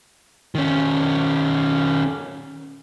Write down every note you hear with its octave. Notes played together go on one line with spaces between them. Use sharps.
D#3 C#4